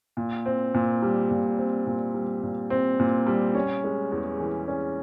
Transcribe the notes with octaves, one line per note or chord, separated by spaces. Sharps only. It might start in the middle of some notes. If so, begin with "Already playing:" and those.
A#2
C4
A#2
G3
A#2
C4
A#2
G3
A#2
C4
A#2
G3
C#4
G#3
E2
E3
C#4